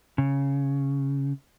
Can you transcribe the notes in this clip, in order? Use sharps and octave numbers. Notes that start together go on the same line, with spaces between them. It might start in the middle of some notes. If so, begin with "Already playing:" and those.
C#3